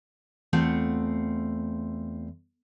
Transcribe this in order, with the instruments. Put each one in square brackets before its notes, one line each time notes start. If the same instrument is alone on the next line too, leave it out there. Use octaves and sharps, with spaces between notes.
[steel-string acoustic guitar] E2 A3 C4 F4 F#5